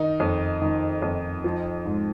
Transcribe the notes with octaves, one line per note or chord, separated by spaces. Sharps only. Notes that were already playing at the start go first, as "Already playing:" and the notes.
Already playing: D#3 D#4
F2
D#3
F2
F3
G#2